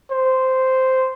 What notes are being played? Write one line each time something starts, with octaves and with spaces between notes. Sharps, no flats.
C5